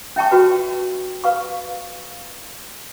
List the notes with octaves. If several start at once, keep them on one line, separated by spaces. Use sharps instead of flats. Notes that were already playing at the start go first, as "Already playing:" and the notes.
C#4 E5 G5 A5 C#6
F#4 B4
B4 F5 C#6